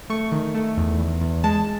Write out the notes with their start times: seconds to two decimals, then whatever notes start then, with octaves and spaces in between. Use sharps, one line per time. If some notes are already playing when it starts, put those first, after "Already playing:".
0.10 A3 C#6
0.32 D#3
0.55 A3
0.77 E2
0.99 E2
1.21 E2
1.44 G#3 A5